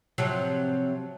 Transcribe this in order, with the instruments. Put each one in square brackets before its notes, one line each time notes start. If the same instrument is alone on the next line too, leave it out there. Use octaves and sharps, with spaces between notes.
[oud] C3 F3 F#3